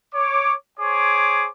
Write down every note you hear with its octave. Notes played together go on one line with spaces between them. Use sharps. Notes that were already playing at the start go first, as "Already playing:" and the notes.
C#5 D6
G#4 C5 C#5 D6